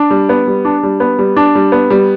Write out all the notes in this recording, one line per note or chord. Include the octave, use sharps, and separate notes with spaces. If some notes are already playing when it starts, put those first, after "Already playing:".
Already playing: D4
G3
B3
G3
D4
G3
B3
G3
D4
G3
B3
G3